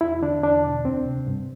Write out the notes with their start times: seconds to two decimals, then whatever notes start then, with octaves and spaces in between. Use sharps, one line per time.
0.01 E2 E4
0.22 D3 D4
0.43 E2 D4
0.65 B2
0.85 D2 C4
1.06 C3
1.27 G2